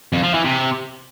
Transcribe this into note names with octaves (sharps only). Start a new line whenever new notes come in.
F2
F3
E3
C3